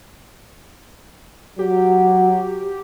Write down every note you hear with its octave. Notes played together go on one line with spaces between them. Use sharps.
F#3 G4